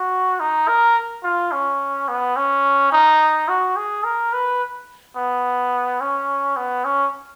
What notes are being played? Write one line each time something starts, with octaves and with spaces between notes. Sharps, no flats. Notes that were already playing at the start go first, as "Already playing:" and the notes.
Already playing: F#4
D#4
A#4
F4
C#4
B3
C#4
D#4
F#4
G#4
A#4
B4
B3
C#4
B3
C#4